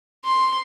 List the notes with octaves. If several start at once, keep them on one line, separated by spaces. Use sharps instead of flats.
C6